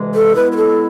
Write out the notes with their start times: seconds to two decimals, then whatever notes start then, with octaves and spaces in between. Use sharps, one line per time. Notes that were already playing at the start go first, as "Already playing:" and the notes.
Already playing: D2 C3 E3 G#3
0.15 A4
0.35 B2 G#3 B3 E4 B4
0.52 B4
0.57 A4